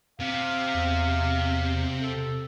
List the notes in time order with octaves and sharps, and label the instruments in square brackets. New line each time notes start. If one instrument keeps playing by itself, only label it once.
[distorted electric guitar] C3 [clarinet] F5
[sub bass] E2
[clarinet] A4